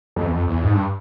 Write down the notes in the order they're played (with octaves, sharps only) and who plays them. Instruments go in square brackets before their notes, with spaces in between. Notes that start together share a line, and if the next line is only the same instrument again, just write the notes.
[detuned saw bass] F2
E2
F2
E2
G#2
G2